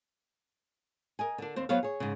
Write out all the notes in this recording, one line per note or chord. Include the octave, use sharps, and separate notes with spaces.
A#4 D#5 G#5
D3 D4
D#2 C4 C5
F#3 B3 C5 C#5 F5
G#4 C#5
G#2 C#3